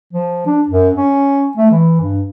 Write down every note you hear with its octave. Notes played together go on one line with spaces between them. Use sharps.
F3
D4
F#2
C#4
A3
E3
G2